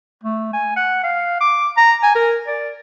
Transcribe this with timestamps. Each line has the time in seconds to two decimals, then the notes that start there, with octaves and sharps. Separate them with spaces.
0.24 A3
0.53 G#5
0.76 F#5
1.03 F5
1.40 D6
1.77 A#5
2.03 G#5
2.15 A#4
2.47 D5